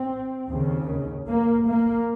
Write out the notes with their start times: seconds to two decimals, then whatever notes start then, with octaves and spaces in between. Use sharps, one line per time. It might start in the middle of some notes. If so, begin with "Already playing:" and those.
Already playing: C4
0.49 D#2 C#3
1.28 A#3
1.67 A#3